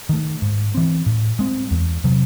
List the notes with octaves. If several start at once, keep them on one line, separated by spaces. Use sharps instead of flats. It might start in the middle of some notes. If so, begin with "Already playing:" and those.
D#3 A3
G#2
E3 C4
A2
G#3 C4
E2
C3 F#3